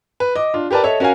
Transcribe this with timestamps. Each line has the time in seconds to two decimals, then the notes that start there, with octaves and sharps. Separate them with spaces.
0.20 B4
0.36 D#5 D6
0.54 D4 F4
0.71 G4 A#4 B4 D5 A5
0.84 A4 C#5 D#5 E5
1.00 C#4 F#4 A#4 C#5 F5 G#5